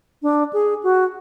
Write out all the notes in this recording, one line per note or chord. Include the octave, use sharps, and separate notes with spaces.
D4
G#4
F#4